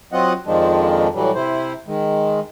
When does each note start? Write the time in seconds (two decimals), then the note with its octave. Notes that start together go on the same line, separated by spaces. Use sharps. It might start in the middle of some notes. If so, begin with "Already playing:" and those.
0.12 F#3 C4 F4 D#5 F#5
0.46 F2 D#3 F3 G#3 D4
1.14 A2 E3 F#3 G3
1.35 C3 E4 C5
1.87 D#3 G#3